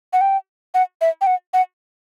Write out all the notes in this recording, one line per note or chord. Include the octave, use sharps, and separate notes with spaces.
F#5
G5
F#5
E5
G5
F#5
F#5